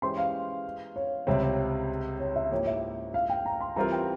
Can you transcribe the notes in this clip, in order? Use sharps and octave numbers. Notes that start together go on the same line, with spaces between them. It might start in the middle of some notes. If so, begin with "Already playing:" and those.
E3 G#3 C#4 G4 C5 C6
F5
C#5
C#2 C3 G3 C4 G4 C#5
C#5
C#5
E5
G#2 F3 A#3 E4 G4 C#5
E5
F5
G5
A#5
C6
E3 G3 C4 F4 A#4 A#5
G5